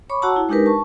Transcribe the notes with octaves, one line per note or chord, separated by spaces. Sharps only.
C#5 B5 C#6 D6
F#4 C#5 F#5 A5 A#5 E6
E4
G#3 D4 D#4 G4 A#4 B4
A5 C#6